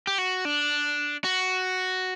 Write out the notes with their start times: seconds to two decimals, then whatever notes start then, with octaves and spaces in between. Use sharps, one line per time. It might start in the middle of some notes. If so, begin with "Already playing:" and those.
0.07 G4
0.18 F#4
0.45 D4
1.24 F#4